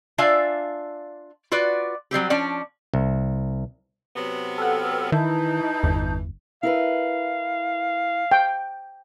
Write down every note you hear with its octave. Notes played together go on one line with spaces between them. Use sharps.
D4 F4 D5 E5 F5 G#5
F4 F#4 B4 D5
F#3 G3 C4 G4
F3 C#4 D4 D5
C2
C3 F#3 B3
A4 F#5 G5 E6 F6
D#3 E3 D#4 E4 A5 G6
G1 E2
E4 A#4 B4 F5
G5